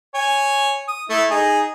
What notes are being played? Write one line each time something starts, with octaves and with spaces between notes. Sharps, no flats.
C#5 G#5
D#6
A3 E4
D#4 G#4